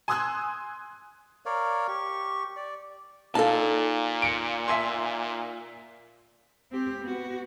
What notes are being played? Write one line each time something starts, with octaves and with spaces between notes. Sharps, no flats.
G#5 C6 D#6 E6 F#6 G#6
A#4 C#5 D5 F5
G4 C#6
D5
A#2 D#4 A4 F5 A5
C#7 D7
E5 G#5 C6
C4 G4
B3 F#4